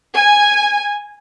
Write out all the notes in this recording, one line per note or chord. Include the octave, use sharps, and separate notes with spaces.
G#5